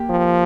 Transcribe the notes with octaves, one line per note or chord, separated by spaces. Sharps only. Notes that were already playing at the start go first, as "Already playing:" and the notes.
Already playing: A#3 G4
F3